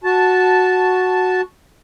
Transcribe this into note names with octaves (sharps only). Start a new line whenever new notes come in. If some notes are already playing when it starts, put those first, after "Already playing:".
F#4 A5